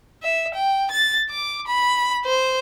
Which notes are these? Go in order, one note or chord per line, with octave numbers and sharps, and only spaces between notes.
E5
G5
A6
D6
B5
C5